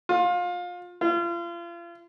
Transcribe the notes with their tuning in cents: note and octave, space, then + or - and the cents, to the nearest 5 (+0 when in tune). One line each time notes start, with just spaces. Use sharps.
F4 +25
F4 -35